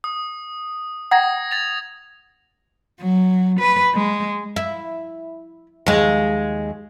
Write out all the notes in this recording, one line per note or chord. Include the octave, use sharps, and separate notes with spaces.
D#6
F#5 G5 A#5 D#6 G#6 A#6
A6 F7
F#3
B4
G#3
E4
D#2 G#3